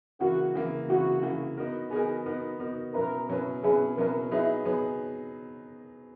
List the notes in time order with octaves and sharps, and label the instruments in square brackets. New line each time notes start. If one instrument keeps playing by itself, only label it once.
[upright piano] C#3 E3 A#3 [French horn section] F#4
[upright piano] C#3 E3 A#3
[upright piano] C#3 E3 A#3 [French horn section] F#4
[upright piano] C#3 E3 A#3
B3 D#4 F#4 A#4
[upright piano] B3 D#4 F#4 A#4 [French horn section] G#4
[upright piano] B3 D#4 F#4 A#4
B3 D#4 F#4 A#4
[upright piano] B2 F#3 C#4 E4 B4 [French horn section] A#4
[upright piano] B2 F#3 C#4 E4 B4
[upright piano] B2 F#3 C#4 E4 B4 [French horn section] G#4
[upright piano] B2 F#3 C#4 E4 B4 [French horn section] A#4
[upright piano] F#3 B3 D#4 G#4 B4 [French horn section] E4
[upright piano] F#3 B3 D#4 G#4 B4